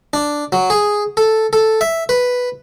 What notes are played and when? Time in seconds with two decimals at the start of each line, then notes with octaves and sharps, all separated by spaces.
0.13 D4
0.52 F#3
0.70 G#4
1.17 A4
1.53 A4
1.81 E5
2.09 B4